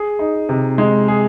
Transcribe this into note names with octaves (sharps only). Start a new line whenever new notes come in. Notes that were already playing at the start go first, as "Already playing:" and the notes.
Already playing: G#4
D#4
C3
G#3
G#4